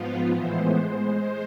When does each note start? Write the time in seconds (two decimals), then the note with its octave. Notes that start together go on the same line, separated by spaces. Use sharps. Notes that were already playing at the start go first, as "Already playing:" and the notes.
Already playing: G#2 F3 B3 F4
0.29 A2 E3 G#3 B3 C5
0.75 G#3